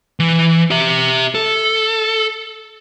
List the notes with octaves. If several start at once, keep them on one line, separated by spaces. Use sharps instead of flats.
E3
G4 E5
A4